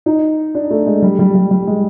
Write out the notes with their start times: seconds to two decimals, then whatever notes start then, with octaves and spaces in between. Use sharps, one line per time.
0.06 D#4
0.55 D4
0.70 A3
0.87 G#3
1.02 G3
1.19 G3
1.35 G3
1.51 G3
1.67 G#3